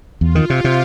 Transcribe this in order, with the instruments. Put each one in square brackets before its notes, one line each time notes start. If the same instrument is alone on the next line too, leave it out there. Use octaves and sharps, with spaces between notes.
[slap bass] E2 [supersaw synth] F4
[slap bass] D#3
C3
C3